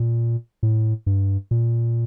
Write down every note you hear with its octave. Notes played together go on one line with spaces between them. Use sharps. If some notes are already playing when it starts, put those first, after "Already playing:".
Already playing: A#2
A2
G2
A#2